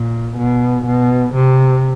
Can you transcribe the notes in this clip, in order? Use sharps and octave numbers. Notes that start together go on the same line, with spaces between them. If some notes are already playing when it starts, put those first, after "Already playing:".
Already playing: A#2
B2
B2
C3